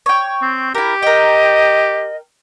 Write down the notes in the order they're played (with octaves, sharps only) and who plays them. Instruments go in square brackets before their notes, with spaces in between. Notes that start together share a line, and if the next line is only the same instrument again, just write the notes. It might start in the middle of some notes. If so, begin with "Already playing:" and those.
[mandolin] C#5 G5
[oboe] C4
[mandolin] E4 A#4 [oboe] G4
[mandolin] A#4 G5 [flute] D#5